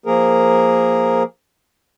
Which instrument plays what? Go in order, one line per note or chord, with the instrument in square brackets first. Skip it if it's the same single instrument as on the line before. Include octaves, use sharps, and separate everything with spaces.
[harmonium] F3 A#3 G#4 A#4